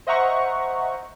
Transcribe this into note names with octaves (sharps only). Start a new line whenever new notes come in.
C5 D#5 E5 F#5 A#5 C#6